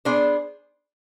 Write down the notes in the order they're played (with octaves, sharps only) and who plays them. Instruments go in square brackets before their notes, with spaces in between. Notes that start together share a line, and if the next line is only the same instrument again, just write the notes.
[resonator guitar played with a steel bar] B3 D4 G#4 C5